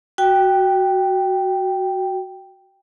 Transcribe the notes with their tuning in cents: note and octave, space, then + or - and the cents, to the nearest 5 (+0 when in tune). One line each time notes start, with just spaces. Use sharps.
F#4 +5 G5 +0